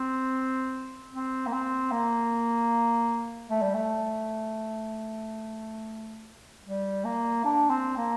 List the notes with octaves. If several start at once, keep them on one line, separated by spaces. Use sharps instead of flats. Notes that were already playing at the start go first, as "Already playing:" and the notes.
Already playing: C4
C4
A#3
C4
A#3
A3
G3
A3
G3
A#3
D4
C4
A#3